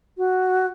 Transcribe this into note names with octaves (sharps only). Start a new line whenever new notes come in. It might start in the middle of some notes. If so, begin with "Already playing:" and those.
F#4